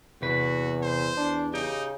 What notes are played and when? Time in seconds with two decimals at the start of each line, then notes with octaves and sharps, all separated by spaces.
0.22 E2 C3 F#4 B4
0.82 C5
1.17 E2 D4
1.54 C#3 D#4 G4